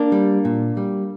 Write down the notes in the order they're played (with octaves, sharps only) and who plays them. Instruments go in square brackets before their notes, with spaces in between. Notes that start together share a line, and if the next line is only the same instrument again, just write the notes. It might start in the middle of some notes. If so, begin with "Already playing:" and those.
Already playing: [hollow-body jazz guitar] A#3 D4
G3
A#2
G3